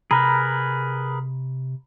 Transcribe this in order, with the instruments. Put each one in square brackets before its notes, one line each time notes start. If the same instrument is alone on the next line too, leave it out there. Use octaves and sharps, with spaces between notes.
[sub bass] C3 [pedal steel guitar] G#4 A#4 B4 [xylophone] A#5 B5